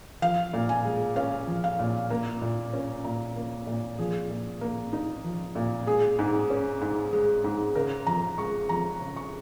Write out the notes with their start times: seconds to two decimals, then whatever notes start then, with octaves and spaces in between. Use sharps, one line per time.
0.22 F3 F5
0.53 A#2
0.69 G#5
0.85 G#3
1.16 C#4 F5
1.47 F3
1.64 F5
1.79 A#2
2.10 A#3
2.42 A#2
2.73 C#4
3.04 A#2 A#5
3.36 A#3
3.67 A#2
3.98 F3 G#4
4.30 A#2
4.61 A#3
4.93 D#4
5.24 F3
5.55 A#2
5.86 G#3 G#4
6.19 G#2
6.50 C#4
6.81 G#2
7.13 G#3
7.44 G#2
7.75 C#3 A#4
8.07 F2 A#5
8.38 G#3 C#6
8.69 F2 A#5
9.01 C#3
9.16 C#6